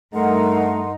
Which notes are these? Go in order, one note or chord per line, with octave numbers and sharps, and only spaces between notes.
G2 A3 D#4 A#4 F#5 C6